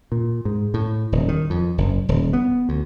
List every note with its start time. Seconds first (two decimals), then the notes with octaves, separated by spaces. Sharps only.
0.12 A#2
0.45 G#2
0.74 A2
1.12 D#1
1.28 D#3
1.50 F2
1.78 F#1
2.09 D#1
2.33 B3
2.69 D2